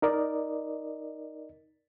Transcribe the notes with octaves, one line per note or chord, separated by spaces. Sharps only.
D#4 A#4 D5 D#5